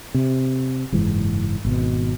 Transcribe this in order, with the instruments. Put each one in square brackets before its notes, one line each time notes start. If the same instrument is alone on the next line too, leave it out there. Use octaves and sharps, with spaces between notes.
[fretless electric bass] C3
F#1 G#2 E3
G#1 B2